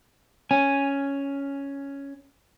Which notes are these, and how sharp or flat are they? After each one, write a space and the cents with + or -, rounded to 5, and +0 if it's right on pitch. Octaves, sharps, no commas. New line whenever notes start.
C#4 +5 G#5 +0